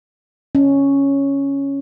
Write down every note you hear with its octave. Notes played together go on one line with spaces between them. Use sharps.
C#4